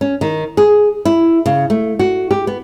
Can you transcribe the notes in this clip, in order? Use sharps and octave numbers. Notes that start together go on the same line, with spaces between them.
C#4
D#3
G#4
E4
C#3
A3
F#4
G4
B3